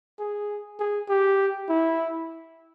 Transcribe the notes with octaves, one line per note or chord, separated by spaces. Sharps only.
G#4
G#4
G4
E4